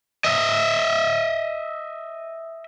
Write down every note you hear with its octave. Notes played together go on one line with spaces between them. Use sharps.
D#5 E5